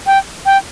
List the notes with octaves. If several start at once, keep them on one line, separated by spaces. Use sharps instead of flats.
G5
G5